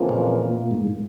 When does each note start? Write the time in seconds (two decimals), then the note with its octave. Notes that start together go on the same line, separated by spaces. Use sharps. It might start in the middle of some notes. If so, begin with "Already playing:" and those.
Already playing: F2 C#3 E3 A#3 F4
0.09 A#2
0.71 G#2